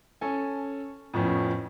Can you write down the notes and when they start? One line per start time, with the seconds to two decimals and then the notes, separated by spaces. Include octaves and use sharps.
0.21 C#4 A4 G#5
1.13 F2 A2 F3 B3 C#4